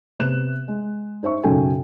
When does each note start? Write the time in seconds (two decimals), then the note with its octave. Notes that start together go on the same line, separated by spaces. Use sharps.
0.19 C3 B3 F#6 E7
0.68 G#3
1.23 D#4 C5 E5 C#6
1.43 B1 F#2 C#3 A4 G5 G#5